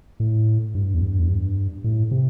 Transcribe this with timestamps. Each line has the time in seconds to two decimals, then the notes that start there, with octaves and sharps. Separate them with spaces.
0.20 A2
0.75 G2
0.94 E2
1.02 G2
1.19 E2
1.29 G2
1.84 A2
2.11 C3